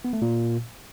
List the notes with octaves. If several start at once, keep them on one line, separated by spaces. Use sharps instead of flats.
B3
A3
A#2